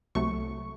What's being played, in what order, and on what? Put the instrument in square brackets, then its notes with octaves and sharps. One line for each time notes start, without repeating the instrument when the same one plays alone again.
[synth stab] C2 C3 F#3 A3 C#6